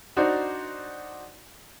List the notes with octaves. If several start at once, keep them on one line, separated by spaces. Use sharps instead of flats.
D4 D#4 F#4 C5 D5